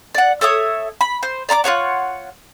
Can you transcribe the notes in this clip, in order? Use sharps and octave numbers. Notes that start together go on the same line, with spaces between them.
D5 F#5
A4 C#5 E5 D#6
B5
C5
D5 A#5 B5 D6
F4 G#4 C#5 F#5